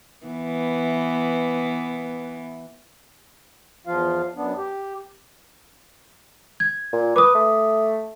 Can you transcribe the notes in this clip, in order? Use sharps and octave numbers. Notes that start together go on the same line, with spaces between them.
E3 B3
E2 F3 F4 F5
F#2 B3 D4
G4
G#6
A#2
B4 D6 D#6
A3